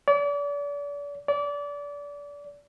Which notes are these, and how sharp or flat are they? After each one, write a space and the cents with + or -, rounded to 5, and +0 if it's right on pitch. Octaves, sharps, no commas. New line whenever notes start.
D5 -40
D5 -30